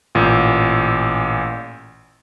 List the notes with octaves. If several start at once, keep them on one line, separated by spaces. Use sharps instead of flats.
A1 A#2